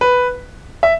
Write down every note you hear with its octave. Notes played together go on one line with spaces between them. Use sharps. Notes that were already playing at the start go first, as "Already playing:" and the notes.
B4
E5